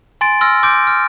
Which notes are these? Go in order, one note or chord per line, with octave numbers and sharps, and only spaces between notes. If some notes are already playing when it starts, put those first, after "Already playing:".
G#5 C6 A6 D7
C6 E6 F6 A#6
C6 D6 G6 D7
F6